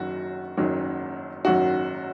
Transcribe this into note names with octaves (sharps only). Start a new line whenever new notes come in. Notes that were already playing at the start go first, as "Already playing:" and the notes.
Already playing: F#1 F#2 D#3 F#3 F#4
F#1 F#2 D#3 F#3
F#1 F#2 D#3 F#3 F#4